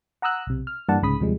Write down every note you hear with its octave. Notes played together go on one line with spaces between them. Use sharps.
F#5 A#5 D#6 E6 F#6
B1 C3
F6
G2 E3 A#3 D5 F#5 A5
C2 G#2 C#3 B5 D#6 B6
D#2 C3 F3 G3 G#3